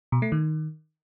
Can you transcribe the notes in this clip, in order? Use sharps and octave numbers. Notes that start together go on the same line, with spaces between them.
B2
A3
D#3